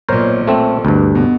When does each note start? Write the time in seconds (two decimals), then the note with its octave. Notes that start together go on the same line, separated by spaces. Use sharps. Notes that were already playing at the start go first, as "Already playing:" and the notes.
0.08 B1 A#2 A#4 C5 C#5
0.47 A3 C4
0.85 D2 G2
1.15 B2